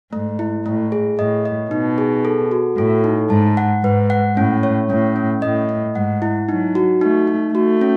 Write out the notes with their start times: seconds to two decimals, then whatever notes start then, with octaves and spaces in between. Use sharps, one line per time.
0.13 G#2 A3
0.39 E4
0.66 A2 A3
0.92 G#4
1.19 A2 D#5
1.45 D#5
1.71 B2 D#4
1.98 G#4
2.25 A4
2.51 F#4
2.77 A2 A4
3.04 D#4
3.30 G#2 A5
3.57 F#5
3.83 G#2 B4
4.10 F#5
4.37 A2 C#4
4.63 C#5
4.90 A2 C#4
5.16 C#4
5.42 A2 D#5
5.69 D#5
5.95 G#2 F#5
6.22 E4
6.49 F#3 D#4
6.75 F#4
7.01 A3 D#4
7.27 D#4
7.54 A3 F#4
7.81 C#4